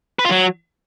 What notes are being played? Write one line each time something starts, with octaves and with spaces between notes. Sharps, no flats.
B4
F4
F#3